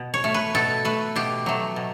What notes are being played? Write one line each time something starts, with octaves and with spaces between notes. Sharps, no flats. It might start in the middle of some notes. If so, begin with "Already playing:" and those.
Already playing: B2
C#5
A3
B4
B2 A4
A3 B4
B2 G4
F#3 A3
B2